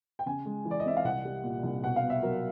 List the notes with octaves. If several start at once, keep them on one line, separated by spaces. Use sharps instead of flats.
G5
C#3 G#5
G#3
E3
D5
D#5
C4 E5
F5
C2 F#5
G3
A#2
C2
B2 F#5
F5
B3
E5
F#3 A#4